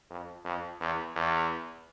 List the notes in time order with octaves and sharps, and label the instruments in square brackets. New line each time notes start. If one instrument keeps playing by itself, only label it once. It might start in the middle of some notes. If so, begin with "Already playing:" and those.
[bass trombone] F2
F2
E2
E2